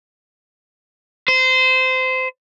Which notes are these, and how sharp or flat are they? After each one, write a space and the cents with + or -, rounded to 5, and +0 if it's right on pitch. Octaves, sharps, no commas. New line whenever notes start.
C5 -20